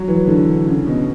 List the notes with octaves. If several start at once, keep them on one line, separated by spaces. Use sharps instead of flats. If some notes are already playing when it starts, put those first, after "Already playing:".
Already playing: F#3
E3
D3
C#3
B2